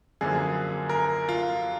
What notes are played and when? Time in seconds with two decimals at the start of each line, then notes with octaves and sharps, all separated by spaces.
0.21 F#2 D3 F3 A#3 G#4
0.89 A#4
1.29 F4